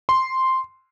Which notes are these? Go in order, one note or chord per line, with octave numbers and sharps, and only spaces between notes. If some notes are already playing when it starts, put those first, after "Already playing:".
C6